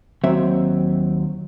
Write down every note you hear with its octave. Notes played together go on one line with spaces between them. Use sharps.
D#2 F#3 C4 E5